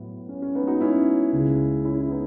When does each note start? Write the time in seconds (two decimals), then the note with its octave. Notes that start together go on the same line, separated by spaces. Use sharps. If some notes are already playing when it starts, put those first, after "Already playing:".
Already playing: A2 F#3 B3
0.29 C#4
0.42 C#4
0.55 B3 D#4
0.67 D#4 F#4
0.80 C#4 E4
1.33 C#2 C#3 G#3
1.85 C#4 E4
2.01 E4
2.10 B3 D#4